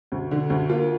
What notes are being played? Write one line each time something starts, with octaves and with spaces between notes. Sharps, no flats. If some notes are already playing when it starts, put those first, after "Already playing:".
D2
D3
D2
A#3 F4